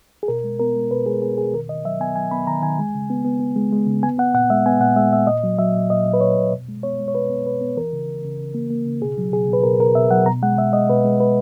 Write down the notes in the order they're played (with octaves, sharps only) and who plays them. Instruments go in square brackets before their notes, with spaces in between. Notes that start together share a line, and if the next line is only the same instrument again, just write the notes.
[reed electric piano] G#4
B2 A#4
G#3
B3 A#4
G#3
B2 B4
G#3 G#4
B3 G#4
B2 G#4
D#3 A#4
D#3 D#5
F#3 E5
B3 G#5
F#3 G#5
B3 B5
D#3 A#5
D#3 G#5
G#3
C#3
B3
B3
B3
G#3
G#3
C#3
B3 G#5
B3 F#5
A#2 F#5
G#3 E5
B3 G#5
A#2 F#5
G#3 E5
A#2 E5
A#2 D#5
F#3
F#3 E5
A#2
A#2 D#5
A#2
B4
A#2 C#5
A#2
B2
G#3
B3 C#5
G#3
C#5
B2 B4
B3
B2 B4
B3
E3 A#4
C#3
C#3
C#3
C#3
A#3
A#3
C#3
B2 G#4
F#3
B2 G#4
B2
B4
B2 A#4
B2 A#4
B2 E5
F#3 F#5
B2 A#5
G#3 F#5
B2 E5
G#3 D#5
B2 B4
G#3
B2 B4